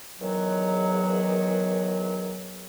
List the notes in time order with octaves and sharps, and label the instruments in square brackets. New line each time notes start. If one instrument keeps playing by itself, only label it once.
[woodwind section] E2 D#3 F#3